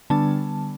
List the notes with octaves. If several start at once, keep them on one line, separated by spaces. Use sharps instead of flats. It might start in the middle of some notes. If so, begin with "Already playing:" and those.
D3 G3 B3 D4 A5